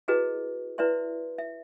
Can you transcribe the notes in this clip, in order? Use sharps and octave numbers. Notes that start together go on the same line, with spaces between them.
E4 F#4 G#4 B4 D#5
E4 B4 D5 E5 C6
E5